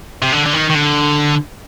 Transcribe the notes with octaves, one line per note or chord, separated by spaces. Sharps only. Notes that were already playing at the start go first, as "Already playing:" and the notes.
C3
D3
D3
D#3
D#3
D3